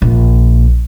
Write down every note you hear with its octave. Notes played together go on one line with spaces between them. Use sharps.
A#1